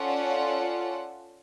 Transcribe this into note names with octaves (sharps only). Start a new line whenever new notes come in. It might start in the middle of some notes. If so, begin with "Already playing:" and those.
Already playing: C#4 F4 A4 D5 F#5